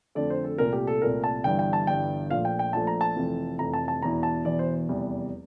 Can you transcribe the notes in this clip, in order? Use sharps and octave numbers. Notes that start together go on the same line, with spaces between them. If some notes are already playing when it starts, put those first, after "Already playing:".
F2 D3 A3 D5
C5
A4
C2 A#2 A3 A#4
G4
A4
C2 A#2 A3 A#4
A5
G1 G2 E3 G3 G5
G5
A5
G1 G2 E3 G3 G5
A#1 A#2 F3 A3 F5
G5
G5
A#1 A#2 F3 A3 A5
A#5
A5
F1 F2 E3 A3
F1 F2 E3 A3 A#5
A5
A5
E1 E2 E3 A#5
A5
E1 E2 E3 D5
C5
F1 E2 E3 G3